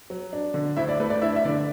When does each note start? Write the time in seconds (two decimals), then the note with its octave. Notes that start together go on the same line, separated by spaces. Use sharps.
0.10 F#3
0.33 D4
0.54 D3
0.77 D2 E4 E5
0.89 D5
1.00 A3 B4
1.10 D5
1.22 D4 E4 E5
1.36 E5
1.44 D3 D5